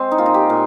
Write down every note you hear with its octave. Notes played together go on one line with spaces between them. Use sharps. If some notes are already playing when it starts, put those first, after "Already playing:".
Already playing: G#3 C4
D#4
A#2 F4
D#4
G4
A#2